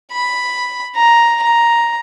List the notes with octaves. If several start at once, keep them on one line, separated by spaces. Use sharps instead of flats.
B5
A#5
A#5